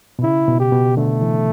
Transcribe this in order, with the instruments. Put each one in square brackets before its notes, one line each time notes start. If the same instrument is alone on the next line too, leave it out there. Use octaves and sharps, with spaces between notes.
[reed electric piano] B2
[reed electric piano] C#3 [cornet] E4
[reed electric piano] B2
[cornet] G4
[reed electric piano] B2
[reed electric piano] D3 [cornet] A3
[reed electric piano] E3